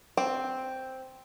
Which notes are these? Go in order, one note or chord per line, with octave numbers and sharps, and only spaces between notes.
C4